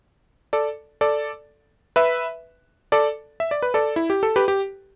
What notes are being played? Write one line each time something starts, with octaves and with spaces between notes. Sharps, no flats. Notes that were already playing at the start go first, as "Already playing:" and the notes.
A4 D5
A4 D5
B4 E5
A4 D5
E5
D5
B4
A4 D5
E4
G4
A4
G4 B4
G4